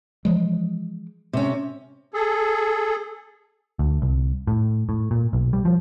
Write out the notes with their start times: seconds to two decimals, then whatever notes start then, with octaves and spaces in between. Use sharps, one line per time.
0.25 E3 F3 G#3
1.33 C3 C#4
2.14 G#4 A4
3.79 D2
4.02 C2
4.47 A2
4.89 A2
5.11 A#2
5.33 B1
5.53 G3
5.65 F3